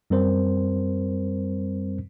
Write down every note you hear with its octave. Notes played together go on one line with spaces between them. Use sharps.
F#2 G3 C4 A#4 C5